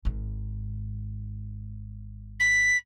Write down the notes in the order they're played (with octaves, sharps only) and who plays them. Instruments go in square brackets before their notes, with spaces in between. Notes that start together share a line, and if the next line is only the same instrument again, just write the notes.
[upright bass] G#1 G#2
[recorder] B6